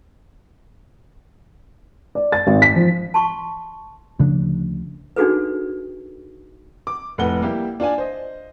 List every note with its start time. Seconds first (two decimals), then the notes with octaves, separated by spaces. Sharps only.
2.15 D5
2.32 A6
2.47 G#1
2.62 B6
2.76 F3
3.14 A5 C6 C#6
4.19 D2 C#3 F3 D4
5.16 D4 D#4 F#4 G#4 A4 B4
6.87 D6
7.18 F1 A2 B4 F#5 G7
7.42 G3 A#3 E4 G4
7.80 D4 F4 D5 G#5
7.98 C5 D#5